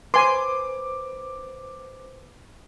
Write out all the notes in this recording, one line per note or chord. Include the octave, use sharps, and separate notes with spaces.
B4 C5 G#5 C6 D6